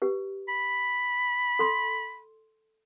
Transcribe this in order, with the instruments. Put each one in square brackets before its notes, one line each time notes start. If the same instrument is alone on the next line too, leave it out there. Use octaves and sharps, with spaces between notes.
[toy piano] G4 B4
[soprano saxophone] B5
[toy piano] A4 C6